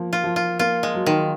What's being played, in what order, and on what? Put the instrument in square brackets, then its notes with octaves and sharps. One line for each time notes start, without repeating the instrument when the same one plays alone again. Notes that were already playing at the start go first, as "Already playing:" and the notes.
Already playing: [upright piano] F3 A#3
[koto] F4
[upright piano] F3
[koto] F4
[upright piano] A#3 [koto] F4
[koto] G#3
[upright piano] F#3
[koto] D#3